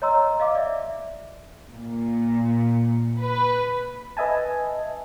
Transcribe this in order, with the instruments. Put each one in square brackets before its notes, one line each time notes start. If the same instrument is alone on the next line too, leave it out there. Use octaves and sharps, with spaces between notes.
[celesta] C#5 D#5 A#5 C6 E6
D#5 F5 D6
D5 E5
[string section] A#2
B4
[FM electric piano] B4 D#5 E5 G#5 A5